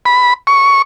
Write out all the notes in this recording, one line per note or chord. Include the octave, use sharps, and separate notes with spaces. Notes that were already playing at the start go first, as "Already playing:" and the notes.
B5
C#6